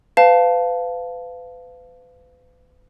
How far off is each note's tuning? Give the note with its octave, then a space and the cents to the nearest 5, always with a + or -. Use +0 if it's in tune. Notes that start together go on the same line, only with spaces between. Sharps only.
B4 +40 F5 +0 A5 +0